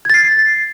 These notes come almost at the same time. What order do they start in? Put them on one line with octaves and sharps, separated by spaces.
G#6 A6 C7